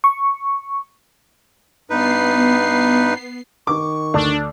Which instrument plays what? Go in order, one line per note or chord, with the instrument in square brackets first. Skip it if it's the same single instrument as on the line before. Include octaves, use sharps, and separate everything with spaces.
[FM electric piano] C#6
[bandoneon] G2 D#4 B4 [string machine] B3 C7
[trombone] D#3 [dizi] C#6 [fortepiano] D6
[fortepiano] D2 [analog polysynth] D4